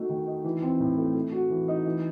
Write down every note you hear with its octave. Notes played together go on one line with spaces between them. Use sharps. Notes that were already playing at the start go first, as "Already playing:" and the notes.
Already playing: A3 D#4 F#4
D#3
D#4
E3
C4
A2
A3
A3
F#4
E3
D#4
E3